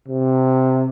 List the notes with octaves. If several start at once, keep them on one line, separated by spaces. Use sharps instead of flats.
C3